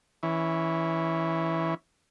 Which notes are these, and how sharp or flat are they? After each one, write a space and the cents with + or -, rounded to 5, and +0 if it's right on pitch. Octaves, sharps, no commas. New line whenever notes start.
E3 -10 C#4 +0